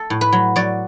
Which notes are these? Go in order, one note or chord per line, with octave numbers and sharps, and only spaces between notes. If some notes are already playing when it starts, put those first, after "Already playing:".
Already playing: A4
A2
B4
F#3
F#3 D5